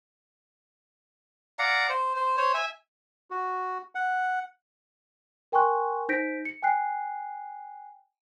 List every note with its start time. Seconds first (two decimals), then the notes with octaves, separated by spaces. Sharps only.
1.59 D5 F5 F#5 A#5
1.89 C5
2.16 C5
2.38 C5 C#5
2.54 E5 G#5
3.31 F#4
3.95 F#5
5.52 A#4 G5 G#5 C6 C#6 F#6
6.09 D#4 C5 G6 A#6 B6 D7
6.45 C#7
6.62 G5 G#5 F#6 C7